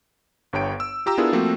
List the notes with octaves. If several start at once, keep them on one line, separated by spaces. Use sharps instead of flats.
G1 G2 C#5 G5 D7
E6
F4 G4 A#5 E6
B3 D4 E4 F4 G#4 A#4
F3 A3 A#3 C4 F#4